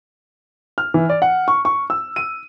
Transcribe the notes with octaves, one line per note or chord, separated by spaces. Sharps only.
F6
E3
D5
F#5
C#6
C#6
E6
D#7